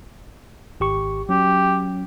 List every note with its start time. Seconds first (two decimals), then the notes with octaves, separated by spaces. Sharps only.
0.80 G#1 G4 C#6
1.29 F#3 C#4 G4